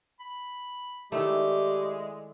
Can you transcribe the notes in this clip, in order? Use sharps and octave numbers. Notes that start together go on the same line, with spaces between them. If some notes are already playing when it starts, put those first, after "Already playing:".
B5
D#3 G#3 A3 E4 G4 D5 E6